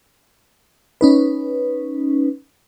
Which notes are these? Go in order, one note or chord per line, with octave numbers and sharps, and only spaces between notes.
C#4 D#4 B4